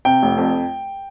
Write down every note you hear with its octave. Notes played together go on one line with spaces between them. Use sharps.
C3 G5
F1
F2